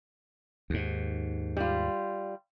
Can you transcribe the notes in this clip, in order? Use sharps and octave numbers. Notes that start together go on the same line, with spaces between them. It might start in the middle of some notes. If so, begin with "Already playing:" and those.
D#2 G#2
G3 F4